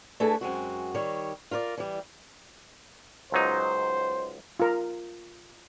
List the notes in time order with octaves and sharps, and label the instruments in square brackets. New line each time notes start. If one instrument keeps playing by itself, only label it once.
[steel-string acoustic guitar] A3 D4 E4 G#4 A4 B4
F#2 G#3 C4 F#4
D#3 G3 C#5
F4 A#4 C5 D5
E3 G3
[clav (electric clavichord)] C#2 F#3 D#4 [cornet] C5
[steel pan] F4 A#4